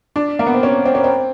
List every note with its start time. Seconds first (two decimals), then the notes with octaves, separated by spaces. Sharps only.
0.16 D4
0.39 A#3
0.46 B3
0.54 C4
0.63 C#4
0.86 C4
0.95 C#4
1.04 C4